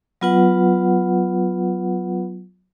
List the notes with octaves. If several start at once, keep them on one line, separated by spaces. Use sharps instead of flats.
F#3 B3 F4 B4 F#5